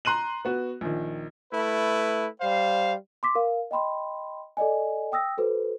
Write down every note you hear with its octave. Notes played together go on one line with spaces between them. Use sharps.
A#5 C6 F#6 D#7 F#7
B3 F#4
A#1 D#3
A3 E4 B4
G3 C5 F5
C6 D6 B6
A#4 F5
D#5 G5 B5 C6
A4 D5 D#5 G#5
G5 D#6 E6 A#6
F#4 A4 B4 C5